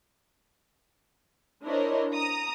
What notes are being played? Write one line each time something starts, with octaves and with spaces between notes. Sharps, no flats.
D4 E4 A#4 C5 C#5 D#5
A#5 D#6